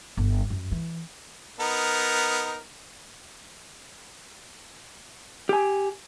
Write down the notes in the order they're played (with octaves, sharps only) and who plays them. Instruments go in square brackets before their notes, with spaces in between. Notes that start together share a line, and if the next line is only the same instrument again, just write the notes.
[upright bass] G1
F#2
E3
[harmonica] B3 D#4 A#4
[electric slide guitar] G4 G#5